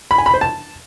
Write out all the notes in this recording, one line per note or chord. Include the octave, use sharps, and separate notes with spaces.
B5
G#5
B5
C5
A5